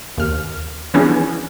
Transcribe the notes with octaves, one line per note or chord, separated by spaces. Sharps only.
D#2 F6
E3 B3 C#4 D4 E4 G#4